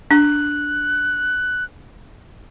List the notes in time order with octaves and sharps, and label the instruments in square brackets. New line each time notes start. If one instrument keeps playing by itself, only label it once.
[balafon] D4 [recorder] F#6